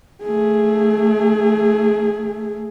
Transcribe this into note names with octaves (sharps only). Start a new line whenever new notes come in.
A3 G#4